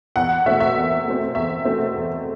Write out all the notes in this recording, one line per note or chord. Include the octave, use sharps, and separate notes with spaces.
E2 F#5
B2 A3 C4 E5
E5
E2
B2 A3 C4
E2 E5
B2 A3 C4
E2